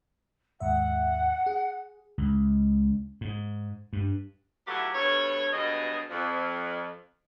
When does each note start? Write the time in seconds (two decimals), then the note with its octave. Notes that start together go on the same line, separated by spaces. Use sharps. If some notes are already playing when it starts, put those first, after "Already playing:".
0.60 D#2 G#2 E5 F#5
1.46 G#4
2.18 C#2
3.21 G#2
3.93 G2
4.67 F#3 A3 B3 E4 F4 G4
4.94 G2 B2 A4 C#5
5.52 G2 B2 F#3 G#4 D#5
6.10 F2